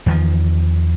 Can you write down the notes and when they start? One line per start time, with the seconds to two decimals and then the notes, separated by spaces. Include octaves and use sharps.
0.06 E2 D#3 F3